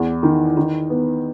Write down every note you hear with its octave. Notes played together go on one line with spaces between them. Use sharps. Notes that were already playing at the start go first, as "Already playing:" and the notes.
Already playing: E2
D#3
D#3
B3